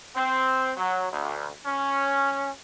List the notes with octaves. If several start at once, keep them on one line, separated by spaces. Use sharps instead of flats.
C4
F#3
D2
C#4